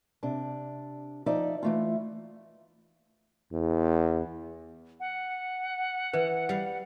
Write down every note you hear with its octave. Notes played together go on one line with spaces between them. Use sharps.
C3 D4
F3 D#4 D5 E5
E3 A3 F4
E2
F#5
E3 B4
G3 F5